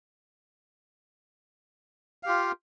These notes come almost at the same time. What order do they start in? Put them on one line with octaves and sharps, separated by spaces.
F5 G4 F4